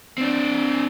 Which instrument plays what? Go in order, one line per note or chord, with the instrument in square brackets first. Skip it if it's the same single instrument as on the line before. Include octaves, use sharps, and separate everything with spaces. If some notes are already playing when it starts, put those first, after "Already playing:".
[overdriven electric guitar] C4 D4